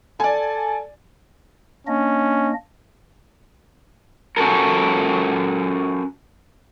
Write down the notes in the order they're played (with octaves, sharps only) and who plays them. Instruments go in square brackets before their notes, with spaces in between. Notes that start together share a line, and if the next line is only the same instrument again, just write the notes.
[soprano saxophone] A4 [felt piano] D5 G#5
[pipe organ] A#3 D4 D#5 [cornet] C#4
[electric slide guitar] C#4 F#4 A4 A#4